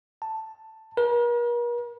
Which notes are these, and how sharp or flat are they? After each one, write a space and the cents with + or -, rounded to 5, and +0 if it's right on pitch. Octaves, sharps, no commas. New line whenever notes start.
A5 +5
A#4 +45